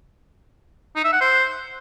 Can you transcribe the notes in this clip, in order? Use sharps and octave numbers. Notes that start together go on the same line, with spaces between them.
D#4
E5
F#5
C5